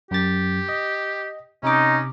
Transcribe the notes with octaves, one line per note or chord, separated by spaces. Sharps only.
F#2 G4 A6
D#5
C3 C#4 D#4 D6